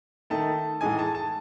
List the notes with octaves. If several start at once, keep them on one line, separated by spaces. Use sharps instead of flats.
D#3 A3 D#4 A5
A2 E3 G#3 D#4 G#5
A5
A5